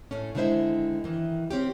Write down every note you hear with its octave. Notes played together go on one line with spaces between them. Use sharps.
A2 A3 C#4
D3 D#3 G#3 E4 C5 E5
D#3 E3
C4 C#4 G4